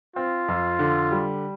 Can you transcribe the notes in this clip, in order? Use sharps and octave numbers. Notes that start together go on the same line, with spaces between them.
C4 F4
F2
D3
G3